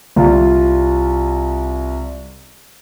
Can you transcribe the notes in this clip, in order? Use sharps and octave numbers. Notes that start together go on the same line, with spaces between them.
C2 F4